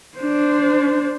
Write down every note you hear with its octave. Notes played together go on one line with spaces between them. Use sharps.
D4 C5